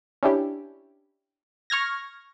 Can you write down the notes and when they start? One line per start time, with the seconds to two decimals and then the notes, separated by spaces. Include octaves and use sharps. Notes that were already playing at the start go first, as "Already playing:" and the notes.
0.23 C#4 D4 E4 G4
1.70 C#6 F6 G#6 A#6